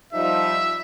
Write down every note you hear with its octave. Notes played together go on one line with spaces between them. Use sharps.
F3 G3 D#4 E5